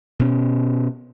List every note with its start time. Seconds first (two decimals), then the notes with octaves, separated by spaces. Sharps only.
0.19 B2 C#4